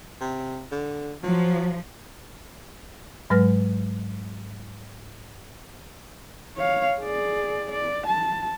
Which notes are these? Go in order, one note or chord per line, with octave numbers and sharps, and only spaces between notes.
C3
D3
F3 F#3
G#2 F#3 G#3 B4 F6 A#6
C#5 F5
G#4 D5
D5
A5